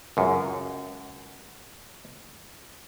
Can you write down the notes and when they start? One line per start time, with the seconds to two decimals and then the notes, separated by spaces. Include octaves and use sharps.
0.17 C#2 F#2